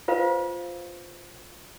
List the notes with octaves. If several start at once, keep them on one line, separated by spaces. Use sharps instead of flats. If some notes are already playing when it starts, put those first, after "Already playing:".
F4 B4 C5 F5